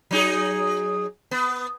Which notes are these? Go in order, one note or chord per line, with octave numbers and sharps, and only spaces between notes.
F#3 D#4 G#4
B3